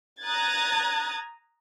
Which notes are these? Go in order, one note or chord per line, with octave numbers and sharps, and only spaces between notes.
A#5 D#6 F#6 G#6 A6